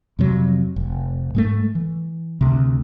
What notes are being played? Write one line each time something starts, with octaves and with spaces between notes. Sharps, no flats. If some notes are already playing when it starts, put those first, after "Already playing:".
F2 C3 F#3
F1
G#2 G#3 A3
E3
D2 C3